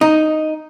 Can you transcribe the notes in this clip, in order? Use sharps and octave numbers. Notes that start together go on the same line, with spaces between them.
D#4